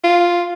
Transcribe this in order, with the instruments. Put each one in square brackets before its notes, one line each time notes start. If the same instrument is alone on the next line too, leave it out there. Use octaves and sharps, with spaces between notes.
[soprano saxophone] F4